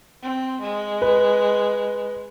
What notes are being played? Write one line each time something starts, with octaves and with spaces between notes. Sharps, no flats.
C4
G#3
B4